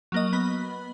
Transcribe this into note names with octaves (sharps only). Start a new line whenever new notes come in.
F#3 A#3 D#5
B3 B5